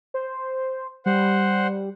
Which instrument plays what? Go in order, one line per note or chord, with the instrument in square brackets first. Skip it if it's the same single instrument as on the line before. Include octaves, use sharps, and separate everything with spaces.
[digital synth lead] C5
[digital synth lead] G3 [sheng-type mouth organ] C5 F#5